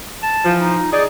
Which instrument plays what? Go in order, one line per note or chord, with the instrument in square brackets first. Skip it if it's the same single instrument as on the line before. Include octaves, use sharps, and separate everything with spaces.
[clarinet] A5
[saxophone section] E3 F3
[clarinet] D#4
[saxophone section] D#4 G#4 [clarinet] D5